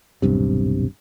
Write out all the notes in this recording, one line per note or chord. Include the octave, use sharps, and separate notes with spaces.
D#1 B1 G2 C3